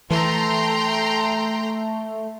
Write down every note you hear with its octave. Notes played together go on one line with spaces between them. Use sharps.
E3 A3 A4 G5 A#5 C6